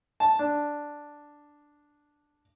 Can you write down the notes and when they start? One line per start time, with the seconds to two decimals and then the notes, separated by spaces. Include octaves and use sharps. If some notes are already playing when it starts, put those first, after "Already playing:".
0.20 A5
0.39 D4